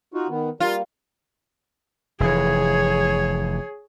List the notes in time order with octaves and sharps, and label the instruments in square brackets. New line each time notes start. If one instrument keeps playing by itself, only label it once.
[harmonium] D#4 F4 F#4
D#3 B3
[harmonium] G3 A#3 [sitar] F4
[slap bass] F1 E3 [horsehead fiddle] G#4 C#5